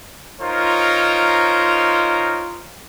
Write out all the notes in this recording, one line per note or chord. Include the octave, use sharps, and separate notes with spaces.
D#4 F4 A#4 C5 C#5